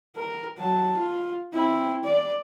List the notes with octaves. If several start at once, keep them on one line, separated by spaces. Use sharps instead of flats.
A#4
F#3 A5
F4
C4 E4
D5